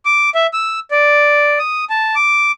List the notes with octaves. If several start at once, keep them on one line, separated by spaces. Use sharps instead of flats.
D6
E5
E6
D5
D#6
A5
D6